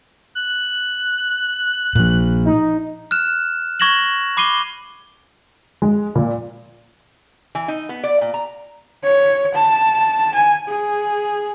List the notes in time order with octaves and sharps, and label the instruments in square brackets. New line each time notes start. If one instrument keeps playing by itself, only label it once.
[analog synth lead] F#6
[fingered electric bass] A#2 F3
[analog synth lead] D#4
[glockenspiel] F6 F#6 E7
C#6 G#6 A#6 E7 F#7
B5 D6 C7 D#7 G7
[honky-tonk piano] G#3
A#2
[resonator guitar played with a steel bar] E3
D#4
B3
D5
A#2
A#5
[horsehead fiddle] C#5
A5
G#5
G#4